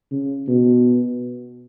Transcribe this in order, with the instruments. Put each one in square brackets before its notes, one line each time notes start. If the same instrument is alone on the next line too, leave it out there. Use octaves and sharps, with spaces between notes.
[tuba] C#3
B2